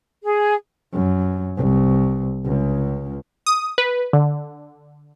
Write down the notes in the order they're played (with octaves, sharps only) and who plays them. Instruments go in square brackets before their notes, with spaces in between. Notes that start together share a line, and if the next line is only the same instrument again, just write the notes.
[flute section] G#4
[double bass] F#2
C2
C#2
[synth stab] D#6
B4
D3